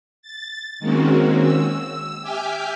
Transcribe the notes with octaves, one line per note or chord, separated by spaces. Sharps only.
A6
D#3 G#3 A#3 C4 C#4 F#4
E6
G4 E5 G#5 D6 F6 G6